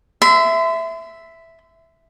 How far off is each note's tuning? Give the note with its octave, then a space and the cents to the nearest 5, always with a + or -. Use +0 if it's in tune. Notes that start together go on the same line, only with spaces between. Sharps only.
E5 +0 C6 -40